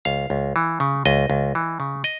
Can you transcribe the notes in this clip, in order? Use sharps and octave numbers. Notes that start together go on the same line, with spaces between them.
C#2 F5
C#2
E3
C#3
C#2 D#5
C#2
E3
C#3
D#5